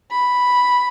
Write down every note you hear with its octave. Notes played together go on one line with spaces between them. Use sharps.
B5